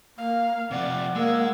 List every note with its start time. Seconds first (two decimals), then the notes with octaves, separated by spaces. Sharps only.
0.18 A#3 F5
0.71 C3 F3 D5 F#5
1.15 G#3 A#3 E6